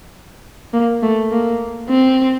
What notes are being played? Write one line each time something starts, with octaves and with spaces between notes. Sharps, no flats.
A#3
A3
A#3
C4